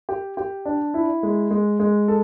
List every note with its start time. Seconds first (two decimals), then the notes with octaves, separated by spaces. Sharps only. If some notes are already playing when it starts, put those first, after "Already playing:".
0.09 G4
0.37 G4
0.65 D4
0.94 E4
1.23 G#3
1.51 G#3
1.80 G#3
2.08 A4